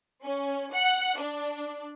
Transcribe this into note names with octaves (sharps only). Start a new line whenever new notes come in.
C#4
F#5
D4